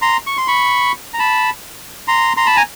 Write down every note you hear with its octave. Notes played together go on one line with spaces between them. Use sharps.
A#5 C6
C#6
C6
B5 C#6
A#5
A5 B5
A#5 C6
A#5 C6
A5 B5
G#5 A#5